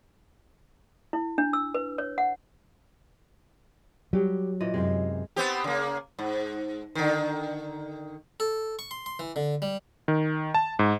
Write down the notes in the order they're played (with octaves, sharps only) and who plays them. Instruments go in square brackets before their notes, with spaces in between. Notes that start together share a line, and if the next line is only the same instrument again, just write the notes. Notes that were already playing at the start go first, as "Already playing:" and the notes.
[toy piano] E4
D4
E6
B4
C#5
F#5
[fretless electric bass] F#3 [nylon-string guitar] G3 G4
[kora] A#2 E3 D#5
[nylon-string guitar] F#2 C3 [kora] G#3
[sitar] B3 C4 G4
C#3 A#3
G#2
D3 D#3
[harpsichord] A4
C#6
C6
C6
E3
D3
G3
[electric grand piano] D#3
A5
G#2